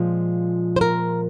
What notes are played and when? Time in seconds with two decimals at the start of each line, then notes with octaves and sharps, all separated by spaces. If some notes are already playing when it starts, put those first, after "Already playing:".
Already playing: A#2 F3 G#3
0.76 C5
0.81 A#4